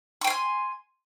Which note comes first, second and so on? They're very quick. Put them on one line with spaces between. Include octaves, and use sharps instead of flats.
C#6 G5 C6 G#5